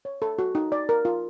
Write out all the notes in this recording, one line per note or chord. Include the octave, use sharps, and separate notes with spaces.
C#5
A4
F#4
D#4
D5
A#4
F4